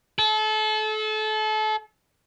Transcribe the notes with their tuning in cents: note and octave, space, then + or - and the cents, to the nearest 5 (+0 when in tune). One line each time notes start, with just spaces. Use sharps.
A4 -30